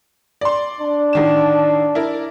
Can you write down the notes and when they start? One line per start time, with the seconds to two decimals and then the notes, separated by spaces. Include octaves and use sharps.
0.41 D5 C6
0.80 D4
1.13 A1 D#3 E7
1.95 E4 A#4 D5